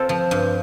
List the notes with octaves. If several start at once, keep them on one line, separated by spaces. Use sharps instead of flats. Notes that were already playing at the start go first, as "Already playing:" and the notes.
Already playing: C4 F4 A4 C5
F3
G2